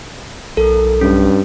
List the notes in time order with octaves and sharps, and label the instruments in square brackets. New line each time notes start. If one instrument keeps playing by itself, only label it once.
[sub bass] B1 [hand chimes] A4 A#4
[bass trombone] G2 [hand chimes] C#4